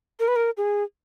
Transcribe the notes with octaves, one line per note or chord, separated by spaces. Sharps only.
A#4
B4
A#4
G#4